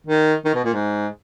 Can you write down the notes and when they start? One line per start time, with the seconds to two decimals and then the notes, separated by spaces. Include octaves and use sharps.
0.07 D#3
0.45 D#3
0.55 B2
0.65 A#2
0.73 G#2